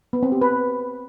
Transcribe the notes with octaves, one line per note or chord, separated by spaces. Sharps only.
B3
C4
G4
B4